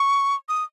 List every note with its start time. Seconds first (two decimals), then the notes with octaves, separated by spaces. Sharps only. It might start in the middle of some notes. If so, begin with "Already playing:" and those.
Already playing: C#6
0.49 D#6